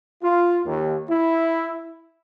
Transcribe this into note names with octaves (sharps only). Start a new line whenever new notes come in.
F4
D#2
E4